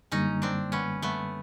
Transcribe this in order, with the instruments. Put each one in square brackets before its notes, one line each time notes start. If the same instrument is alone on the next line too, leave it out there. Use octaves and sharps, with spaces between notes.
[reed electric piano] F#2 D3 G3 A#3 [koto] C#4 D#4
[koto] C4 D4
B3 C#4
A3 B3